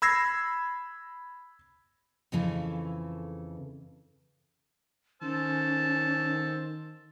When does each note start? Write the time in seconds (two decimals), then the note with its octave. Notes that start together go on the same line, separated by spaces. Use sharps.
0.02 B5 E6 G#6 A#6 C7
2.32 F2 C#3 E3 A3
5.22 D#3 C#4 C5 A5 E6